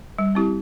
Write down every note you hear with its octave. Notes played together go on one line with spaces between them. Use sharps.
G3
C4 E4 G4